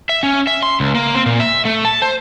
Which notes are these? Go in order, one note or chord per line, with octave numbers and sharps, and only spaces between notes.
E5
C#4
E5
C6
C#2
A#3
C4
A#2
E5
A3
A5
C5